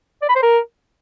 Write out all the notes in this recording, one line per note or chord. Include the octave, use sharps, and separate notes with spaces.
D5
B5
C5
A#4